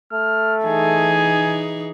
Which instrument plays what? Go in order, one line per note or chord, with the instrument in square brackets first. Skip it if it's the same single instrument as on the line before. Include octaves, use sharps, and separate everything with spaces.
[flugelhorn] A3 [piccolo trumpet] F6
[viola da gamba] E3 D#4 G#4 [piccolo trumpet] G#5